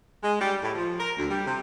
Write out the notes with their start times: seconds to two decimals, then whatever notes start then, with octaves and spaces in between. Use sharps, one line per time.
0.22 G#3
0.40 G3
0.62 A2
0.75 F3
0.99 A#4
1.18 D2
1.29 G3
1.45 C3